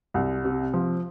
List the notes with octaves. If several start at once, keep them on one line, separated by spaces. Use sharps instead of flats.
C2
C3
F3